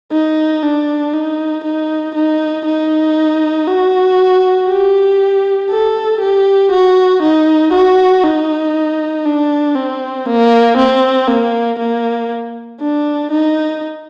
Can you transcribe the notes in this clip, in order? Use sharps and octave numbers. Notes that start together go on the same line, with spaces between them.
D#4
D4
D#4
D#4
D#4
D#4
F#4
G4
A4
G4
F#4
D#4
F#4
D#4
D4
C4
A#3
C4
A#3
A#3
D4
D#4